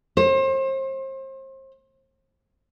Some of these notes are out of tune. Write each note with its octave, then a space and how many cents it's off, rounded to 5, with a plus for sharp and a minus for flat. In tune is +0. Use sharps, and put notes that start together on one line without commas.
C5 +35